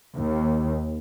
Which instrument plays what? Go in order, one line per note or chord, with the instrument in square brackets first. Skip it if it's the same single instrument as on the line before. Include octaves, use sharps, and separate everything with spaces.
[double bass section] D#2